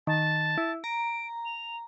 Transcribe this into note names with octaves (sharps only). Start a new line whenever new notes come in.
D#3 A5
E4
A#5 D7
F7